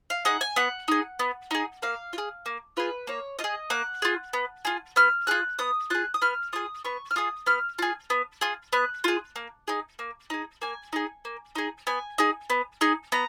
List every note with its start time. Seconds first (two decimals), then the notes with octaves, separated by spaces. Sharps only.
0.10 F5
0.25 D#4 G#4 F#5
0.41 G#5
0.56 B3 F#5
0.88 D#4 G#4
1.19 B3
1.51 D#4 G#4
1.82 A#3 F5
2.13 F4
2.18 G#4
2.46 A#3
2.77 F4 G#4 B4
3.07 A#3 C#5
3.39 F4 D#5
3.44 G#4
3.70 A#3 F#5
4.02 F4 G#4
4.33 B3
4.65 F4 G#4
4.96 B3 F6
5.27 F4 G#4 F#6
5.59 B3 D#6
5.90 F4 G#4 F#6
6.14 D#6
6.22 B3 F6
6.53 F4 G#4 D#6
6.85 B3 C#6
7.11 F6
7.16 F4 G#4 D#6
7.46 B3 F6
7.79 F4 G#4
8.10 B3
8.41 F4 G#4
8.73 B3 F#6
9.04 F4 G#4
9.36 A#3
9.68 D#4 G#4
9.99 A#3
10.30 D#4 G#4
10.62 A#3 G#5
10.93 D#4 G#4
11.25 A#3
11.55 D#4 G#4
11.87 B3 G#5
12.18 D#4 G#4
12.50 B3
12.81 D#4 G#4
13.12 B3 A#5